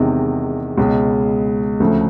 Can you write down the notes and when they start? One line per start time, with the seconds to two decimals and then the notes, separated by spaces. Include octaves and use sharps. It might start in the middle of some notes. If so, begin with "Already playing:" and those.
Already playing: E2 C3 D#3 G#3
0.78 C#2 B2 G#3
1.80 D2 C#3 F3 A3